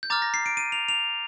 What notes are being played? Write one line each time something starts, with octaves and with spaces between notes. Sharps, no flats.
G6
A#5 D6 F6 A6
A#6
C7
D7
D#7
F7
F7